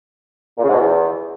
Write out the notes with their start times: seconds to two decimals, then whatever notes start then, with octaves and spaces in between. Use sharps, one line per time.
0.58 A#2
0.63 C#3
0.69 G#2
0.74 B2
0.79 E2